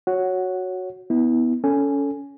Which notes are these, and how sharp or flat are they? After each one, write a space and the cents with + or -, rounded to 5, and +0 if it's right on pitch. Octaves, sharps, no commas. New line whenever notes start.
F#4 -5 C#5 +0 F#5 +0
B3 +0 E4 -30
C#4 +20 A4 +0 G#5 +0